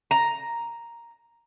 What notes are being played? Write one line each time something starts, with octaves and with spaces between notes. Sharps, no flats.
A#5